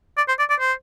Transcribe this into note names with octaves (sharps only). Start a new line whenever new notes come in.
D5
C5
D5
D5
C5